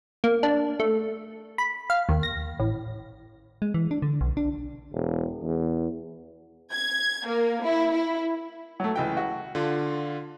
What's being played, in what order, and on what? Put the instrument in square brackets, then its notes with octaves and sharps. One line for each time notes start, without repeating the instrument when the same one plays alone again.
[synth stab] A#3
D4
A3
B5
F5
D#2
A#6
A1
[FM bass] G#3
E3
D4
D3
B1
D4
[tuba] E1
E2
[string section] G#6
A#3
E4
E4
[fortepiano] F#3 A3
C#2 E3 G5
F#4
[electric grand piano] D3 F4